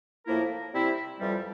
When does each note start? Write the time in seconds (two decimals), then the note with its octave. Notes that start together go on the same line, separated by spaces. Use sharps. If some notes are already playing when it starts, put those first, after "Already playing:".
0.26 A2 F3 A#3 E4 A#4
0.73 C3 G3 C4 E4
1.19 F2 E3 G3